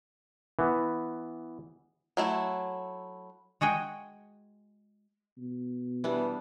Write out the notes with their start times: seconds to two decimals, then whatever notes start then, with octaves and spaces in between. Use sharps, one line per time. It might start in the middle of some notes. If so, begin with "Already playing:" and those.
0.59 E3 B3
2.17 F#3 A3 E4
3.61 G#3 F#4 G#4 G5
5.38 B2
6.04 E3 G3 B3 D4